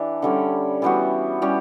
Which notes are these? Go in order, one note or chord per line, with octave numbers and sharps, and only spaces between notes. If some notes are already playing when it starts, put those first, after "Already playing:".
Already playing: E3 D4 G4
D3 G3 C#4
E3 G3 B3 F#4
E3 G3 C#4 G4